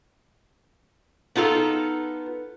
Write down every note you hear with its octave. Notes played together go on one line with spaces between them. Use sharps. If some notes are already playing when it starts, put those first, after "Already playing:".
B3 D#4 F4 A4